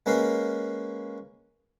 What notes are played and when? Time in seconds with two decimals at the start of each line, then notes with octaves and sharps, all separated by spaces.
0.06 G#3 A#3 C#4 A#4 B4 F5